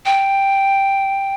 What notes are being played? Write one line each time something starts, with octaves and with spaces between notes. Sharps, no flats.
G5